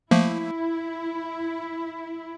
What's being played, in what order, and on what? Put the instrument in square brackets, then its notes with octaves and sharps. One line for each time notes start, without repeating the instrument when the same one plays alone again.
[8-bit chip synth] F3 A3 A#3 [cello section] E4